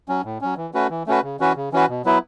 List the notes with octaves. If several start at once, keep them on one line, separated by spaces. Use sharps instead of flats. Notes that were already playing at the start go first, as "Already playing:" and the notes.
F#3 C#4
A2
F#3 C#4
E3
A3 C#4 F#4 B4
E3
A3 C#4 F#4 B4
C#3
E3 C#4 F#4 B4
C#3
E3 C#4 F#4 B4
B2
F#3 B3 E4 B4